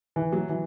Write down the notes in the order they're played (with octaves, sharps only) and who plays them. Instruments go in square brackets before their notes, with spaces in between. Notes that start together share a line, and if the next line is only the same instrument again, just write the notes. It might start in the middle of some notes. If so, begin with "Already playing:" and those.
[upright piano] E3
F#3
E3